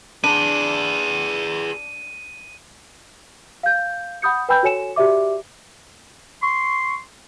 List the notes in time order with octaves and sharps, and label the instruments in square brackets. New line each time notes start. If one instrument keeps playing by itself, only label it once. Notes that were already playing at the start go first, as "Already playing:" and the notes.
[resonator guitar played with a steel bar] D4 [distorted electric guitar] G#4 B4 [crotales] D#7
[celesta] F5 G6
F#5 B5 D#6 G6 C#7
B4 G5 G#5 B5 E6 G6
F#4 A4 C#5 G#5 C#7 E7
F#4 G4 D5 E5 D6
[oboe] C6 [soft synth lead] C#6